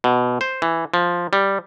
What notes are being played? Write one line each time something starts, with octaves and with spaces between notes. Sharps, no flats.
B2
C5
E3
F3
G3